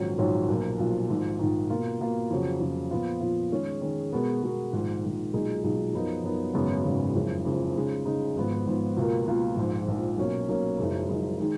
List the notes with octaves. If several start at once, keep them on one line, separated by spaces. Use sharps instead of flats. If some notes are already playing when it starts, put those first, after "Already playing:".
Already playing: A#1 G#2 D#3 F#3 C#4
A#1 G#2 D#3 F#3 C#4
B1 A#2 F3 A#3
B1 A#2 F3 A#3
A#1 G#2 D#3
A#1 G#2 D#3
B2 A#3 F4
B2 A#3 F4
F2 C#3 F#3
F2 C#3 F#3
A#2 F3 B3 F4
A#2 F3 B3 F4
D#3 G#3 C#4 G#4
D#3 G#3 C#4 G#4
B2 G#3 B3 F#4 A#4
B2 G#3 B3 F#4 A#4
A#1 G#2 D#3
A#1 G#2 D#3
B1 A#2 G#3 D#4 G#4
B1 A#2 G#3 D#4 G#4
F#2 F3 B3 D#4 A#4
F#2 F3 B3 D#4 A#4
G#1 F#2 C#3 G#3 B3
G#1 F#2 C#3 G#3 B3
F#1 F2 C#3 G#3
F#1 F2 C#3 G#3
C#3 G#3 D#4
C#3 G#3 D#4
G#1 G#2 F3 B3
G#1 G#2 F3 B3
C#2 B2 A#3 F4 A#4
C#2 B2 A#3 F4 A#4
A#1 G#2 F3
A#1 G#2 F3
B1 B2 A#3 C#4
B1 B2 A#3 C#4
F#1 F#2 F3 G#3 D#4
F#1 F#2 F3 G#3 D#4
D#3 G#3 D#4